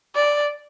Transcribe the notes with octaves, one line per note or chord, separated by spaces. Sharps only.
D5